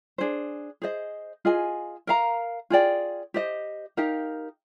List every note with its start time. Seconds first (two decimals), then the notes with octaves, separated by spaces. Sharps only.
0.18 D4 G#4 C5
0.82 G#4 C5 D#5
1.45 F4 G#4 D#5 G#5
2.07 A#4 F5 A#5
2.70 F4 G#4 D5 G5
3.34 G4 C5 D#5
3.97 D#4 G4 A#4 F5